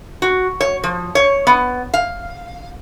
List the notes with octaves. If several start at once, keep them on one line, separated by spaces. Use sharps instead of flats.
F#4
C#5
F3
C#5
B3
F5